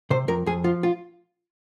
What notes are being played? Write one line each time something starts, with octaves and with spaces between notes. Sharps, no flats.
C3 C5
F2 A#4
F2 G#4
F3 F4
F4